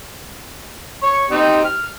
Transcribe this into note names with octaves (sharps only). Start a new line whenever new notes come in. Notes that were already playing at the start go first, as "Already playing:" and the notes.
C#5 C#6
C4 D#4 G4
F6